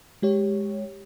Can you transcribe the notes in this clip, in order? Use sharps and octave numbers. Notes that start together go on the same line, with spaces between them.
G#3 G4 C#5